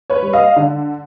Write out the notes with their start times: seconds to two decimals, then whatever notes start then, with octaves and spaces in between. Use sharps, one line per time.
0.10 B4 C#5
0.22 G3
0.33 D#5 F5
0.56 D3